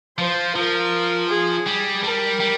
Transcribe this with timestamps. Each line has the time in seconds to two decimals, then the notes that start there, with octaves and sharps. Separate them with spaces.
0.18 F3 C5
0.55 F3 A#4
1.29 G#4
1.67 G3
2.04 G3 A#4
2.40 G3